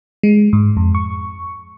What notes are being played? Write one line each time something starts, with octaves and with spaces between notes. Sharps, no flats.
G#3
G#2
F2
C#6